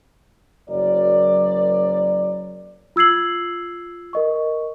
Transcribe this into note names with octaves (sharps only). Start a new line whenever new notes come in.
F#1 F#3 A#4 C#5 D5
F4 E6 G#6 C7 F#7
A#4 D#5 C#6